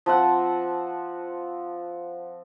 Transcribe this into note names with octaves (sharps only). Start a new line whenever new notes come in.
F3 C4 F#5